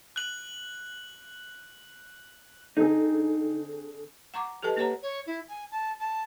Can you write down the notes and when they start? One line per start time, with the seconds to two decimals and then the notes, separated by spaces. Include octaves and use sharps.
0.16 F#6 F#7
2.77 D3 C4 D#4 G#4
4.34 F#5 A#5 C#6 D6
4.63 G4 A4 B4 D#5 A5
4.76 A#3 G4 B4 C#5 F#5 A#5
5.02 C#5
5.26 E4
5.49 G#5
5.71 A5
5.99 A5